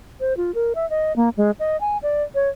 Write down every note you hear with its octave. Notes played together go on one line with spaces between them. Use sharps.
C5
F4
A#4
E5
D#5
A#3
G#3
D#5
G#5
D5
C#5